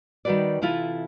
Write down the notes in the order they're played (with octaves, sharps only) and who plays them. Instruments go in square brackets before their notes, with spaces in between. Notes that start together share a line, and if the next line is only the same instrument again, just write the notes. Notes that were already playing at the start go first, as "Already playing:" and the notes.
[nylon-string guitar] D#3 G3 G#3 F#4 B4 D5
C3 E3 E4 F4 A4